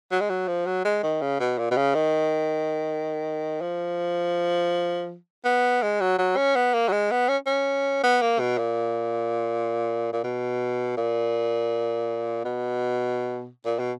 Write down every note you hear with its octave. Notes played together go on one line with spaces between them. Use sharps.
F#3
G#3
F#3
F3
F#3
G#3
D#3
C#3
B2
A#2
B2
C#3
D#3
F3
B3
G#3
F#3
F#3
C#4
B3
A#3
F#3
G#3
B3
C#4
C#4
B3
A#3
B2
A#2
A#2
B2
A#2
B2
A#2
B2